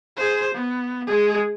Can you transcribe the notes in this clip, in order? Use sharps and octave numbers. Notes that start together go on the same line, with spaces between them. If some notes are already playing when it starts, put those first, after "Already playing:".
G#4 C5
B3
G#3 G#4